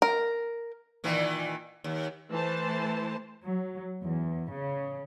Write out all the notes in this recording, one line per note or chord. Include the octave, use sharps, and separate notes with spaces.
A#4
A#2 D#3 E3
D#2
E3 A3 C5 A5
F#3
E2
C#3